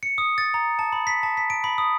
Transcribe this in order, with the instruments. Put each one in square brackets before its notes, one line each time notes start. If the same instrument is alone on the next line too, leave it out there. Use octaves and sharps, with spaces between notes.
[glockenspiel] C#7
D#6
A6
A#5
A5
B5
B6
A5
B6
D7
B5
D#6